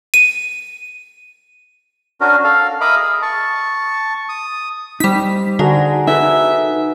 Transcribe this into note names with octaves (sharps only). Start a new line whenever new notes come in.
D#7
C#4 D4 F#4 A#4
A4 F5
A#4 D#5 E5 B5 D6
G#4
A5 C#6
D#6
G3 D#4 C5 B6
D3 F#4 G#4 A#4
D#4 A4 B4 E5